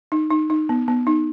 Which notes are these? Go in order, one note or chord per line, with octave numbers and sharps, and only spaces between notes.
D#4
D#4
D#4
B3
B3
D#4